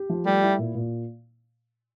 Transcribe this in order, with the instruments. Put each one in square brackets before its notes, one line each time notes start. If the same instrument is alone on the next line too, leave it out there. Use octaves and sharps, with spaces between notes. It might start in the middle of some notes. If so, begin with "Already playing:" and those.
Already playing: [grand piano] G4
F3
[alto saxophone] G3 [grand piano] A3
[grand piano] E4
A#2
A#2